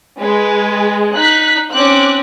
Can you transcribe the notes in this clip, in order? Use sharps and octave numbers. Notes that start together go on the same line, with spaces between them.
G#3 B4
D#4 F#6 B6
C4 C#4 D6 F#6